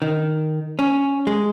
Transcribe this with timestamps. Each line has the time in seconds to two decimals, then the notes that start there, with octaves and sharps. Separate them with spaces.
0.02 D#3
0.79 C#4
1.27 G#3